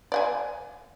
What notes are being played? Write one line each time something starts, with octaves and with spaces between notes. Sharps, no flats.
D5 F#5 G#5